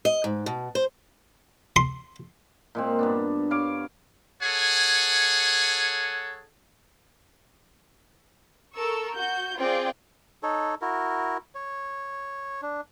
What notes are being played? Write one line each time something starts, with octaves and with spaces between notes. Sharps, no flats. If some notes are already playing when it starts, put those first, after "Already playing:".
D#5
G#2
B2
C5
C6
A#2 G#3 C4
G2 B3 D4
G2 C#5 F5 D6
G#4 A4 C#5 F#5 G#5
A4 A#4 C#6 E6
F#4 G6
C4 F4 G#4 D5 G5
D#4 A4 C#5
E4 F#4 A#4
C#5
D4